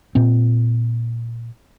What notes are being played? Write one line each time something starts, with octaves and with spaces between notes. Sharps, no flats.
A#2 C4